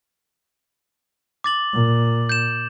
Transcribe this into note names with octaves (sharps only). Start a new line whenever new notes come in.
D6 A6 F#7
A#2
G6 E7